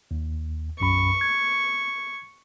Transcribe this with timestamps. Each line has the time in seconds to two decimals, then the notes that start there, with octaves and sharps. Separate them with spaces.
0.11 D#2
0.80 B1 F#2 B5 C#6
1.21 G#6